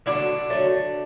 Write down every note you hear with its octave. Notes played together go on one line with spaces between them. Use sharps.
D3 F#3 A3 D4 E4
D3 F#3 A3